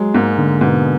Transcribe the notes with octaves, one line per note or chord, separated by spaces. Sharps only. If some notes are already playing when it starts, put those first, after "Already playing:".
Already playing: F#3 G#3
G#2 A#3
D3
G#2 B2